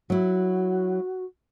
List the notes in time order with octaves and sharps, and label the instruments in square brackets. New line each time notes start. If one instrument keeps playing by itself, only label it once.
[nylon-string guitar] F#3 E4 [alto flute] F#4